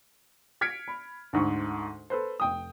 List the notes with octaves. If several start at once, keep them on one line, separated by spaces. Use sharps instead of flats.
F6 G#6 B6 C#7 D7
B5
D2 G#2 D3 C#6
A4 B4 C5
F1 G5 D#6